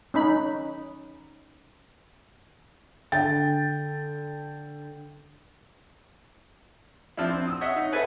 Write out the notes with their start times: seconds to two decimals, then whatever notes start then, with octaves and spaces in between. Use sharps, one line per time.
0.14 C#4 D#4 B5
3.12 D3 G5 A6
7.17 F3 C4 D4 E4
7.31 C4
7.47 D#6 E6
7.61 C#5 D#5 E5 F#5
7.76 D#4
7.92 G#4 A4 B4 E5 F#5 G#5